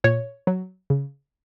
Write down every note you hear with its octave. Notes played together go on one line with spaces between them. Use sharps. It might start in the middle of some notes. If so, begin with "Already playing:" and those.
A#2 C#5
F#3
C#3